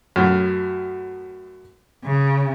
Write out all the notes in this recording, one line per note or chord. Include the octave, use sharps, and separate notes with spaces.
F#2 A2
C#3